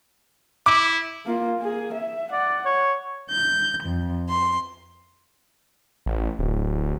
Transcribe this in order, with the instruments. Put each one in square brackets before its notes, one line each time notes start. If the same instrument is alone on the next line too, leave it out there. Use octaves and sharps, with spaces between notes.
[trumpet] E4 [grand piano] D6
[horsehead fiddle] A#3 F4
A#3 G#4
E5
[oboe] D5 [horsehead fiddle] F#5
[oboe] C#5
[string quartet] G6
F2
C6
[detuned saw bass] A1
D1